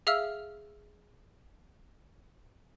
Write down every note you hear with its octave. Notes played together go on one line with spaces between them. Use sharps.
G#4 E5 F5 E6 F6